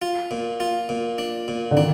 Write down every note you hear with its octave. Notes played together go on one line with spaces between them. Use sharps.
F4
A#2
F4
A#2
D4
A#2
D3
D#3 D4